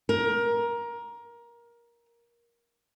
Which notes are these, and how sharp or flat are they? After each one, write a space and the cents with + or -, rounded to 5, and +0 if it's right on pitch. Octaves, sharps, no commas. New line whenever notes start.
A#4 +20